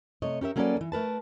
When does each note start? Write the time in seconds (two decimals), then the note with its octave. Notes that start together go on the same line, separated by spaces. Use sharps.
0.22 C3 A3 C#5 D#5
0.41 C#4 G4 A#4 E5
0.56 F#3 A#3 C#4 A4 B4 D5
0.77 E2 E3
0.92 A3 A#4 B4 A5